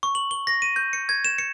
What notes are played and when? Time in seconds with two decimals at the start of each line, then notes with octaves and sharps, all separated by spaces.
0.03 C#6
0.15 F#7
0.31 G7
0.47 A#6
0.62 D#7
0.76 G6
0.93 C#7
1.09 G#6
1.25 E7
1.38 C#7